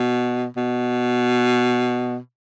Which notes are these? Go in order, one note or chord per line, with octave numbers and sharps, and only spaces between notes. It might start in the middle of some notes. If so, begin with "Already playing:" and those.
Already playing: B2
B2